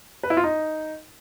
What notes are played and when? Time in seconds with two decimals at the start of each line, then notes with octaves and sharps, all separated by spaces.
0.23 B4
0.30 E4
0.37 F4
0.44 D#4